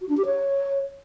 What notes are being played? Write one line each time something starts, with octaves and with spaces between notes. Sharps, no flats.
F#4
D4
G4
C#5